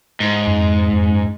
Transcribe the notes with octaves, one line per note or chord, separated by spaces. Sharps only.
G#2
F#2
F2
F2
F#2